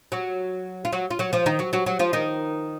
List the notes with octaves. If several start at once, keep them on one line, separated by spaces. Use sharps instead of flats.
F#3 F#4
F4
F#3 F#4
F4
F#3 F#4
F3 F4
D#3 D#4
F#3 F#4
F#3 F#4
F#3 F#4
F3 F4
D#3 D#4